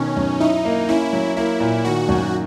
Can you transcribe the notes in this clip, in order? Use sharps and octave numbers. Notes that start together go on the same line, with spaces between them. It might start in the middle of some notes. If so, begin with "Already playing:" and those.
Already playing: B2 D#3 C#4
F#2
D#4 E4
A#3
C#4 E4
F#3
A#3 E4
A#2
D#3 F#4
F#2